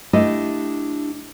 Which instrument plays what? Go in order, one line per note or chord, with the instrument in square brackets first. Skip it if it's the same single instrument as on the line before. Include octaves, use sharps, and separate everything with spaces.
[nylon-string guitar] A3 D4 E4 G4 D#5